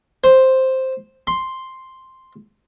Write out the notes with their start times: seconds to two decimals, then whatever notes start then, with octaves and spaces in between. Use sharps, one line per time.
0.24 C5
1.27 C6